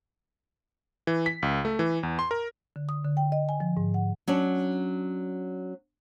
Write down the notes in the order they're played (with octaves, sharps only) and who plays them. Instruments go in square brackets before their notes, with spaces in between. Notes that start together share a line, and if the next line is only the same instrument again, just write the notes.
[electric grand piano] E3
B6
C#2
A3
E3
E2
C6
A#4
[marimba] D3
D#6
D3
G5
D#5
G#5
F3
G#2
F#5
[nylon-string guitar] F#3 C#4 D4